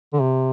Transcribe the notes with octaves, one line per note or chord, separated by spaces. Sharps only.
D3
C3